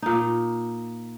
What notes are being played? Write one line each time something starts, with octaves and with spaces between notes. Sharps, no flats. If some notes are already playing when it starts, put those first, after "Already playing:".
A#2 D#4